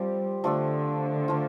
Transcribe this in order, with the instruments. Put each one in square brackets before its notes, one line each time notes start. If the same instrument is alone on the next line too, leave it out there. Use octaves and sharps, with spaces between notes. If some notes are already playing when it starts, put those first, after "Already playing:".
Already playing: [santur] F3 C4 G4 [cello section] G3
[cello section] D3 [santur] F3 A3 D4 A4
[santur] F3 A3 F4